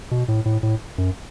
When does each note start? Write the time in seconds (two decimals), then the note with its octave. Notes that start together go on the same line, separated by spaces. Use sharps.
0.11 B2
0.28 A2
0.45 A2
0.63 A2
0.98 F#2